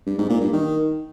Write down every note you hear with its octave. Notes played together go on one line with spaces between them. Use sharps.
G2
G#2
A#2
G2
D#3